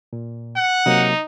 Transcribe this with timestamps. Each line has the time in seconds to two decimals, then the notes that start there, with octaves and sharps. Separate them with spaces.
0.13 A#2
0.57 F#5
0.86 C3 F#3 A#3 D#4